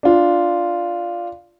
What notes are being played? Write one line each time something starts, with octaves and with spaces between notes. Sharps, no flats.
D4 F4